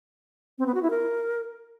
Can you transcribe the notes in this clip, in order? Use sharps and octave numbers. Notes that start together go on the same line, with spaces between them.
C4
B3
F#4
E4
A#4